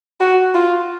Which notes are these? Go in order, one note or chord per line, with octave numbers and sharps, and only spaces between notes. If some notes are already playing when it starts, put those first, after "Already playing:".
F#4
F4